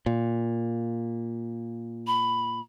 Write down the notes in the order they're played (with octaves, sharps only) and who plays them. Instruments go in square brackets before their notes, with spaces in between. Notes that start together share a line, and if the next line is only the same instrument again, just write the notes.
[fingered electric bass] A#2
[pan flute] B5